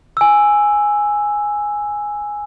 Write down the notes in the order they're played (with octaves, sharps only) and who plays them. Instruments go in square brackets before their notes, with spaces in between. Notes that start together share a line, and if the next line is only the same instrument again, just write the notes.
[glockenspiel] G#5 E6